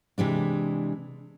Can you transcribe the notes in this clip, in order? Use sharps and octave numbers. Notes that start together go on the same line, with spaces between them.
C3 E3 G#3 D4